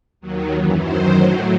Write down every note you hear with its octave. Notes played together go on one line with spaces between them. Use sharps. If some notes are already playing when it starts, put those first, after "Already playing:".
D#2 D#3 F#3
F#2 E3
F#2 D#3 F#3 C5
A2 F#3